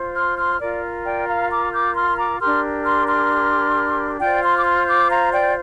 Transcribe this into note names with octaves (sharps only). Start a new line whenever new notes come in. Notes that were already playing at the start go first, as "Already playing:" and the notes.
Already playing: F4 C5
C6 F6
C6 F6
F4 A#4 D5
D5 G5
F5 A#5
A#5 D6
D6 G6
C6 F6
A#5 D6
D4 G4 A#4 C6 F6
C6 F6
C6 F6
F4 C5 D5 G5
C6 F6
D6
C6 F6
D6 G6
F5 A#5
D5 G5